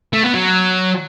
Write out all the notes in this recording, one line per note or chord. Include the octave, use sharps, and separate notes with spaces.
A3
B3
F#3